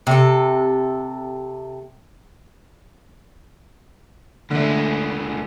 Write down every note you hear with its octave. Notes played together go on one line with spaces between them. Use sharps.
C3 A4
D2 D3 G#3 A3